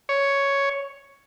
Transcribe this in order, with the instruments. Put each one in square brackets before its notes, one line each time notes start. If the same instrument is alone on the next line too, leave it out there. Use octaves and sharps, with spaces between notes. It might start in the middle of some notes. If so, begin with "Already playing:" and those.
[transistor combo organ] C#5